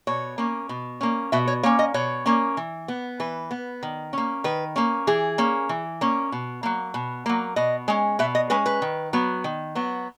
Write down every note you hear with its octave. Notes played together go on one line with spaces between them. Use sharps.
B2 C#5
A#3 C#4
B2
A#3 C#4
B2 E5
C#5
A#3 C#4 C#5
D#5
B2 C#5
A#3 C#4
E3
B3
E3 B4
B3
D#3
A#3 C#4
D#3 B4
A#3 C#4
E3 G#4
A#3 C#4
E3
A#3 C#4
B2
F#3 A#3
B2
F#3 A#3
B2 D#5
G#3 C#4
B2 E5
D#5
G#3 C#4 B4
B4
D#3
F#3 B3
D#3
F#3 B3